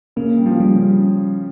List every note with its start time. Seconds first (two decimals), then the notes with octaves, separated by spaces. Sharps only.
0.16 C#3 A#3
0.37 G3
0.45 C#3 F3
0.60 G3
0.74 C#3